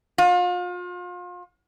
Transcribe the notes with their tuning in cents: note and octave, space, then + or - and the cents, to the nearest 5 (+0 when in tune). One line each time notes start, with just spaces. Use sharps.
F4 +35